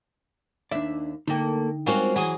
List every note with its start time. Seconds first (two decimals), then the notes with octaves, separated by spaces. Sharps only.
0.71 D#2 D4 D5 E5
1.27 D3 A3 A#3 D#4 G5
1.87 G3 G#3 A#3 C4 C#4 F4 F#4
2.16 E3 F#3 G#4 D#6